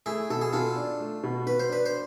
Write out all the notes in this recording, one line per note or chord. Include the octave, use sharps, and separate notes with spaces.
A3 E4 G#4
B2 A4
G#4
B2 F4 A4
D4
A3
B2
B2 B4
C5
D4 B4
C5